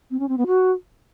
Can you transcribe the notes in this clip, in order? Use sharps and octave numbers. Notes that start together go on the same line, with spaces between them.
C4
C#4
C4
B3
F#4